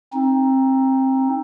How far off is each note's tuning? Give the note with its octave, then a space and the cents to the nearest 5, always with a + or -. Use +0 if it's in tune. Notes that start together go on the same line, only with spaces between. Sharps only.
C4 +20 D#4 +0